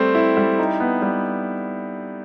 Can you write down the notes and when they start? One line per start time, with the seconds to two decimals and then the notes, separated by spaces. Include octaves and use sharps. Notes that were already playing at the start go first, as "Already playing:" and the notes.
Already playing: G3 A3 C4
0.15 E4
0.37 G3
0.59 D#4
0.80 B3
1.02 G3